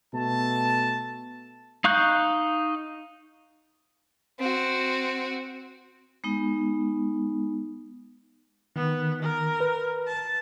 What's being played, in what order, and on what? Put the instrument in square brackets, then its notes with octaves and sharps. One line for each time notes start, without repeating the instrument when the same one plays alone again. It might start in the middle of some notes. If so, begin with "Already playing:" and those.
[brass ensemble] B2 A3 A5
[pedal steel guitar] D#4 F5 C#6 F#6 G6
[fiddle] C4 F#4
[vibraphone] G#3 B3 D#4
[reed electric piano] D#3 [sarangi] B3
[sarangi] A#4
[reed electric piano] B4
[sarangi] A5